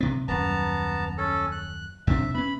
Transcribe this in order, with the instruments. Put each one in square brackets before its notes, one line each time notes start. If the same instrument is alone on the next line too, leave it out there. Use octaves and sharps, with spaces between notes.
[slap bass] C3 B3
[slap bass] D#1 F#2 [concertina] B3 A5 A#5
[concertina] C#4 A4
F#6
[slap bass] F2 C3 D4 [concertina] E5
[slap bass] B3 C#4 [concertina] B5